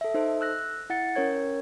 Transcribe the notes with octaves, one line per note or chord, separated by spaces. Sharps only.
A4 E5
D#4 A4 C5
E6 F#6 A#6
E4 F#5 A6 C#7
C#4 A#4 C#5 G#6